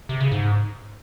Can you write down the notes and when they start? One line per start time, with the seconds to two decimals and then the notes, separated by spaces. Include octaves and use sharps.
0.09 C3
0.20 C#3
0.32 G#2